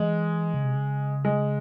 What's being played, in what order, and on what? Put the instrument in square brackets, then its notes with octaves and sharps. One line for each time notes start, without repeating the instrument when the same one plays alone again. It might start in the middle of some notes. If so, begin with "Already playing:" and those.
Already playing: [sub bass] E3 [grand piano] G#3
[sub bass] C#3
C3
C#3
[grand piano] G#3